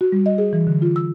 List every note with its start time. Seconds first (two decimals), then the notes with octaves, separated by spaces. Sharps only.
0.01 F#4
0.12 G3
0.26 D#5
0.38 G#4
0.53 E3
0.67 D3
0.82 F4
0.96 E6